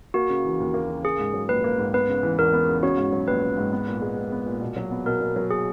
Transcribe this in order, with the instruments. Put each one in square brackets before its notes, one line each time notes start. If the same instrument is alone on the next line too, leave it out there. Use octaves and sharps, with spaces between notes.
[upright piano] A#3 [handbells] F#4
[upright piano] C#3
E3
D#2
A#3
C#3
[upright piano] A#3 [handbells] G#4
[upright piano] G#2
F#3
[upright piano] A#1 [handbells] B4
[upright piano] A#3
G#2
[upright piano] B3 [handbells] B4
[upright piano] C#3
E3
[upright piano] E2 [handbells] A#4
[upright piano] B3
C#3
[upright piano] C#4 [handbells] F#4
[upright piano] G#2
F#3
[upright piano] A#1 [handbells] B4
[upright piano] C#4
G#2
B3
A#2
G#3
A#1
B3
A#2
B2
F#3
B3
[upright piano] B2 [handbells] A#4
[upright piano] B2
F#3
[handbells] G#4